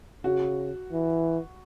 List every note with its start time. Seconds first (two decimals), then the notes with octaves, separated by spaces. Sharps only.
0.24 C#3 F#4
0.92 E3